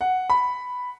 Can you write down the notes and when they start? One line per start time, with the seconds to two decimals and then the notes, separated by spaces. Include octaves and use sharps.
0.01 F#5
0.30 B5